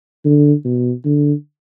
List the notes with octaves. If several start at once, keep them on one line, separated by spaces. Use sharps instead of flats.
D3
B2
D3